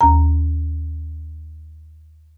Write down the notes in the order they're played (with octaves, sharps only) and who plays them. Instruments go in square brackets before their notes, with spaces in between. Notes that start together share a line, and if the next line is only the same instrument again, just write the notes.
[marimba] D#2 A#5